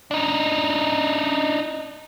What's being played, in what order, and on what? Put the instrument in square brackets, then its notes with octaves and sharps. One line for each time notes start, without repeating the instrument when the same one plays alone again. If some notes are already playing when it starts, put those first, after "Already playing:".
[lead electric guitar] D4 D#4